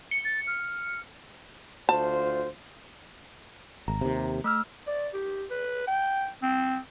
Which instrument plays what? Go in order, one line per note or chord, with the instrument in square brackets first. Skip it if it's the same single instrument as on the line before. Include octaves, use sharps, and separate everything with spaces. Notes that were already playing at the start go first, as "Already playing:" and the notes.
[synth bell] C#7
[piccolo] A6
F6
[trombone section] D2 F4 C5 [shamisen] A5
[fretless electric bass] G#1 [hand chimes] A#5
[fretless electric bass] D#2 C3
[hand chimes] A3 E6 F6
[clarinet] D5
G4
B4
G5
C4